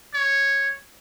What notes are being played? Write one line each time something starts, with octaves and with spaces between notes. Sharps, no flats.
C#5